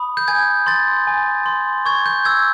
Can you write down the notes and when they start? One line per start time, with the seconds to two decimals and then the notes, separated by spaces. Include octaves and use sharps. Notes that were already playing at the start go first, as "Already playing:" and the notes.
Already playing: B5 D#6
0.17 G6
0.28 G#5 G#6
0.67 C6 A6
1.07 G#5
1.46 C6
1.86 C#6 G#6
2.06 G6
2.25 E6 G#6